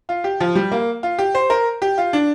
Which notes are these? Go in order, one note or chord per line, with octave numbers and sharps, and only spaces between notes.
F4
G4
F3
G3
A#3
F4
G4
C5
A#4
G4
F4
D4